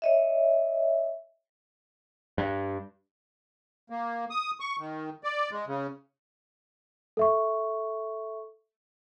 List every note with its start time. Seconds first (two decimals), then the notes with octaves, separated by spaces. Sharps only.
0.02 C#5 D#5 E5
2.38 G2
3.90 A#3
4.30 D#6
4.60 C#6
4.79 D#3
5.24 D5
5.51 G#3
5.67 C#3
7.17 A4 E5 C#6